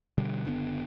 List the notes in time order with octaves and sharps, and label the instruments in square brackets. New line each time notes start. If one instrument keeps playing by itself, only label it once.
[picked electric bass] B2 D3 G3
F#1 D3 B3